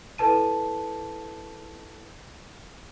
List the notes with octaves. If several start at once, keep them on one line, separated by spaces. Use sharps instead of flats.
E4 A4 B4 A5 D#7